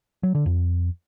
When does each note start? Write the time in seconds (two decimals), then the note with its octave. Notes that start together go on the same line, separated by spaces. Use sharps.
0.23 F#3
0.35 D3
0.46 F2